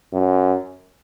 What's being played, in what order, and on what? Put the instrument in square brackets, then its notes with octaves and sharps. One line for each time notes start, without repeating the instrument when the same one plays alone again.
[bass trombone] F#2